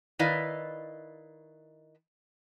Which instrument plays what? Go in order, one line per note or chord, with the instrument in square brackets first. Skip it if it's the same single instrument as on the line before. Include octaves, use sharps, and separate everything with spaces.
[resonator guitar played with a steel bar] D#3 E4 B4 D5 D#5 F5